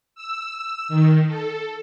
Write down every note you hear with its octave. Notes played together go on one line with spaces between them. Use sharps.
E6
D#3
A4